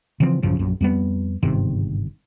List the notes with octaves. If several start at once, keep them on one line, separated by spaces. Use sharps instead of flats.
C#3 E3 F3 C4
A1 F#2 C#3 F3
A#1 F#2
F2 G3 B3
G1 G#2 C3 D#3